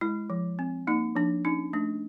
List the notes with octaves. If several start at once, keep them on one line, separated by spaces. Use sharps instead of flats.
G#3 E4
F3
C4
A#3 D#4
F3 D4
C#4 D#4
A3 D4